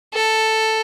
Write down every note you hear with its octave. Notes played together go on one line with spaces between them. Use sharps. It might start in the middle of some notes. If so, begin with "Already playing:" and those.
A4